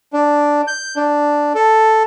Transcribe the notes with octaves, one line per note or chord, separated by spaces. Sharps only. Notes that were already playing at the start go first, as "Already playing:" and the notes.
D4
G6
D4
A4